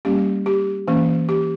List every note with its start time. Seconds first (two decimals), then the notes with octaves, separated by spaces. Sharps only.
0.05 G3 A#3 C#4 G4
0.46 G4
0.88 E3 A#3 C#4
1.29 G4